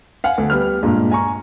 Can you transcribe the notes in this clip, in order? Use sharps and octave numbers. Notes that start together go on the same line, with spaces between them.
F5 F#5 G#5
D2
G3 B3 F6
G2 A#2 G#3
G#5 A#5 C#6